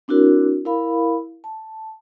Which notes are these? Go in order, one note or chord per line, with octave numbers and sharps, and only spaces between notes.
C4 D4 E4 F#4 A#4 C#5
E4 A#4 F5 B5
A5